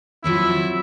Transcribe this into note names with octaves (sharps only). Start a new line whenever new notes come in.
F3 F#3 C4 E4